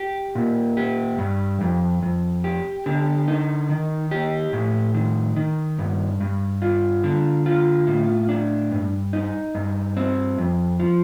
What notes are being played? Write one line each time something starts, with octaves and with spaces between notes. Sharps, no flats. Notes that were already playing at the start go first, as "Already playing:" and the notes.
Already playing: G4
A#2
G4
G2
F2
F2
G4
D3
D#4
D#3
G4
A2
D#3
D#3
G2
G2
F4
D3
F4
A2
D4
G2
D#4
G2
C4
F2
F3